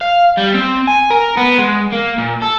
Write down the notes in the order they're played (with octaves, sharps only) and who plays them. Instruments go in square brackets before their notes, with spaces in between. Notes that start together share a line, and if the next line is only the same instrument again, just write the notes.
[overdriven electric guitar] F5
G3
C4
G#5
A#4
B3
G#3
A#3
A#2
A4